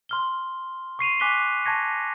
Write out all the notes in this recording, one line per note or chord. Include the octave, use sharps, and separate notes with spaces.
C6 F6 G7
C#6 C7 D#7 F7
G#5 D6 F#6 B6 C7 G7
A5 C#6 G#6 A#6 C#7